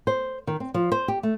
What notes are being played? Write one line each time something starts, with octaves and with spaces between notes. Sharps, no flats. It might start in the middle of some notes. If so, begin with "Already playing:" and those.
C5
D#3
C4
F3
C5
G4
A3